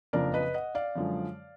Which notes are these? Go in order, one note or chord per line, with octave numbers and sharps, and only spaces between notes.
F#1 F2 F3 A#3 D4 A#4 D5
B4 D#5
D#5 F#5
D5 F5
F#2 D3 F3 G#3